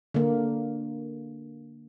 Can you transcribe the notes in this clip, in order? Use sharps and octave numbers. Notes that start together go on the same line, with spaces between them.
D3 A#3